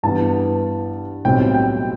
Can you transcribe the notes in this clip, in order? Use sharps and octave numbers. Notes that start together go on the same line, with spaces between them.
G2 E3 B3 A5
B1 A2 G3 C4 G5
G5